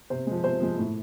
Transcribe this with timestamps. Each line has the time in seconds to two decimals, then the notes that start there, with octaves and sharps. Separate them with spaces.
0.10 C3 C5
0.27 F3 G#3
0.44 C3 C5
0.60 F3 G#3
0.78 A2